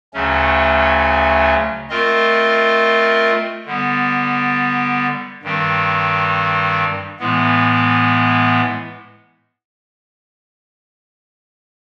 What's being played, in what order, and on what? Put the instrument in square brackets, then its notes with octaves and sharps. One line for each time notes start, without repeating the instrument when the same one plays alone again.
[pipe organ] D2 C#3 F#3 A3 C#4
A3 C4 F4 A#4 D#5
D3 G3 B3
G2 D#3 G3 C4
A2 E3 G#3 B3